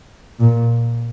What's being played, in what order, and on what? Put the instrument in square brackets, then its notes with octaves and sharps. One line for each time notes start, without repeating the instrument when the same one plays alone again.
[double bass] A#2